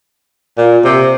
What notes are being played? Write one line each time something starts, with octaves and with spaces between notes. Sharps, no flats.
A#2
C3